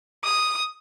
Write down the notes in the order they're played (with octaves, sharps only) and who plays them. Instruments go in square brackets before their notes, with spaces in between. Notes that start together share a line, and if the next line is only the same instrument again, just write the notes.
[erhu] D#6